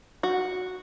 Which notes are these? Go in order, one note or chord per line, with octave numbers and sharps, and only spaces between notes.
F#4